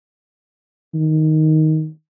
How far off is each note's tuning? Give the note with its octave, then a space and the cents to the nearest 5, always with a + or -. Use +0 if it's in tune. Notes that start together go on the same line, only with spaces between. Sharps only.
D#3 +5